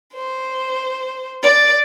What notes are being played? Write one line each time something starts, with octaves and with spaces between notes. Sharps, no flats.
C5
D5